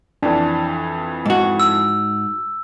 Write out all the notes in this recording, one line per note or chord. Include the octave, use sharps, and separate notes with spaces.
F2 E3 D4
G#2 F#4
E6